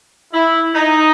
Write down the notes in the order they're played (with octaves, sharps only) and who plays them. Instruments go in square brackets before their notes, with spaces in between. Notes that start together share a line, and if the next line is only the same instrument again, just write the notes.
[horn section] E4
D#4